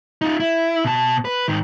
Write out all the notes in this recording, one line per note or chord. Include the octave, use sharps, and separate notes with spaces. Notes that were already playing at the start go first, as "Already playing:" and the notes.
D#4 F4
E4
B2 A5
B4
G#2 D#3